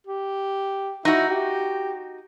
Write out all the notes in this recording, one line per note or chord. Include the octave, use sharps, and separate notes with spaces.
G4
D#4 E4 F#4
G4